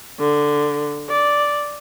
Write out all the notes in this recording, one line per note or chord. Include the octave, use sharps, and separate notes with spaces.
D3
D5